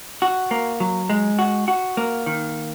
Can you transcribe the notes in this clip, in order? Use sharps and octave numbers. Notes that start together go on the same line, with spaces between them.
F#4
A#3
F#3
G#3
F#4
F#4
A#3
D#3